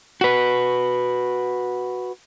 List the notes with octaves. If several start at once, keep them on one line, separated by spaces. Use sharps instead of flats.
F#4 B4